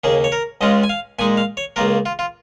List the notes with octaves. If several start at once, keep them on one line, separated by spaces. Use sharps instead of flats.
D#2 C#3 A#3 G#4
C#5
A#4
C#2 C#3 G#3 C#4 F4 D#5
G#5
F5
A#2 G#3 D#4 G#5
F5
C#5
C#2 C#3 A#3 F4 A#4
F4
F4